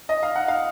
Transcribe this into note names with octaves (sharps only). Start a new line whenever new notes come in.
D#5
F5
F#5
F5